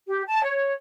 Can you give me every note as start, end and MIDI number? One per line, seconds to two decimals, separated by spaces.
0.07 0.23 67
0.27 0.41 81
0.43 0.72 73